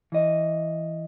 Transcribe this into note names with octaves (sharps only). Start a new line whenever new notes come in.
E3 D#5